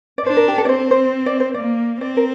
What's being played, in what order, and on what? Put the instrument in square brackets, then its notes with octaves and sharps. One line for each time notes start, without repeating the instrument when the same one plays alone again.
[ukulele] D5
[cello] D4 [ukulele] C5
[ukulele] A#4
G4
A4
D5
[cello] C4 [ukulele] C5
[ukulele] C5
D5
C5
[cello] A#3 [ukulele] D5
[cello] C4 [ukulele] D5
[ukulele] A#4